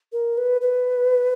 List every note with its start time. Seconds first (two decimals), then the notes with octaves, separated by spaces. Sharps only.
0.13 A#4
0.38 B4
0.61 B4